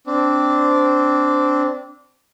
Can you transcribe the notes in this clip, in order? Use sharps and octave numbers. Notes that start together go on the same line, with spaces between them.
C4 D4